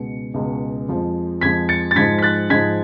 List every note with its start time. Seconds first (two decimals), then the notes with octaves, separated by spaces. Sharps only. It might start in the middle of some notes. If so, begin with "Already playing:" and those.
Already playing: C#2 B2 G#3 C#7
0.34 C#2 B2 G#3
0.88 F2 F3 G#3
1.41 F2 F3 G#3 G#6 B6
1.69 A6 C#7
1.91 A6
1.96 G#2 F3 G#3 G#6 B6
2.18 B6
2.22 F#6 A6
2.50 G#2 F3 G#3 G#6 B6